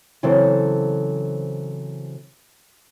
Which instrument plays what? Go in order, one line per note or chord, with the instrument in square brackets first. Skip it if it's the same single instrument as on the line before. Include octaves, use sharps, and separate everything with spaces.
[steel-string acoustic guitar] C#3 E3 F#3 C4 A4 C5